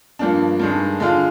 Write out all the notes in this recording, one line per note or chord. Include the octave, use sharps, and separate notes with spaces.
G2 F3 A#3 D4
G2 D#3 G#3 D4
D3 G#3 D4 F4